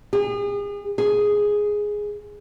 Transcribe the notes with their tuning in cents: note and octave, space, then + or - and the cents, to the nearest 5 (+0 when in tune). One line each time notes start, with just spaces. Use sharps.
G#4 -35
G#4 +0